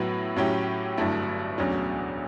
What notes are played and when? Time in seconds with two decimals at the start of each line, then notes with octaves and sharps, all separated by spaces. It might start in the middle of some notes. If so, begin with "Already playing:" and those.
Already playing: A2 F#3 B3 E4
0.36 A2 F#3 C#4 E4 G4
0.98 G1 G2 F#3 A3 E4
1.58 E1 D2 D3 F#3 C#4